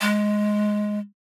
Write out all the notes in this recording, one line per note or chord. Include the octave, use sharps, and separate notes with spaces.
G#3